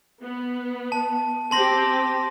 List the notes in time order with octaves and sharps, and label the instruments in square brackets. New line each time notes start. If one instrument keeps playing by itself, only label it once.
[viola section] B3
[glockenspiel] A5
[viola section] C4 G4 [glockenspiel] A5 C6 A#6